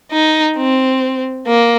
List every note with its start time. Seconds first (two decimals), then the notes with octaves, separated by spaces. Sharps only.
0.12 D#4
0.57 C4
1.47 A#3